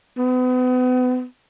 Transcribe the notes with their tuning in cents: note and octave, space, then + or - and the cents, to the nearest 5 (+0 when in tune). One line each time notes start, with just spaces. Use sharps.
B3 +35